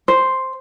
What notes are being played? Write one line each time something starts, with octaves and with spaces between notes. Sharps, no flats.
C5